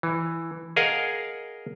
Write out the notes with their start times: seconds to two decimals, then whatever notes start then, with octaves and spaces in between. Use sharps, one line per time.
0.03 E3
0.76 G#4 A#4 D#5 F5 F#5 G#5